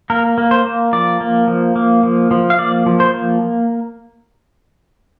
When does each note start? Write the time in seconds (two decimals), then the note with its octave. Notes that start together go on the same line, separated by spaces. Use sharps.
0.10 A#3 A#4
0.38 A#3
0.51 C5
0.65 A#3
0.93 F3 D5
1.21 A#3
1.48 F3
1.76 A#3
2.03 F3
2.31 F3
2.50 F5
2.58 A#3 D5
2.86 F3
3.00 C5
3.14 A#3